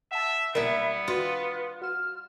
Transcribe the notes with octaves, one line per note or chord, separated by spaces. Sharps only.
E5 F#5 A5
B1 G3 A#3 B3 E4 A#4 E5
D#2 F4 F#4 B4 D#6
F#4 F6 E7